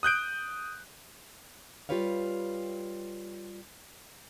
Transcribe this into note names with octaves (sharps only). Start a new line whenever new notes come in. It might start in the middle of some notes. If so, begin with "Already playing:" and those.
D#6 F#6 G6 D7
G3 F4 G4 B4 C#5 F5